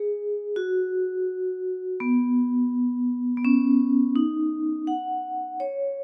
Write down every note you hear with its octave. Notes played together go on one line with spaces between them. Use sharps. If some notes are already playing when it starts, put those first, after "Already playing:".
Already playing: G#4
F#4
B3
B3
C#4
D#4
F#5
C#5